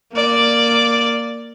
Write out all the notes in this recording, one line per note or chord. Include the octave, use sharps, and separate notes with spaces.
A#3 D5